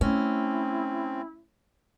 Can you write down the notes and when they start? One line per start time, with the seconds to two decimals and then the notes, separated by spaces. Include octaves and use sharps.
0.01 A3 C4 C#4 E4